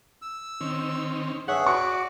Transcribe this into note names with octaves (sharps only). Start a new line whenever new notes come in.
E6
D#3 C4 C#4
G2 G#4 C#5 E5 F#5
F#4 D5 C#6